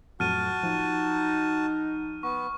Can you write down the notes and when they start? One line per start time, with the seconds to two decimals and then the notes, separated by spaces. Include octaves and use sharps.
0.20 F2 A2 F#3 F#4 A5 F6 D#7
0.63 F3 D#4
2.23 B3 C#6